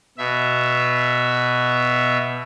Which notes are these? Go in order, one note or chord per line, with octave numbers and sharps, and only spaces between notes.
B2 E5